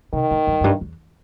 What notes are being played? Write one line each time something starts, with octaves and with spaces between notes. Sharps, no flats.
C3 D#3
A2
G2
F#2
G2
E2